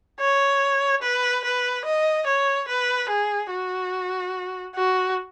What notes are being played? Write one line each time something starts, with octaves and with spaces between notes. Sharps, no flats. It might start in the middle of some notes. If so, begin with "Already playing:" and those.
C#5
B4
B4
D#5
C#5
B4
G#4
F#4
F#4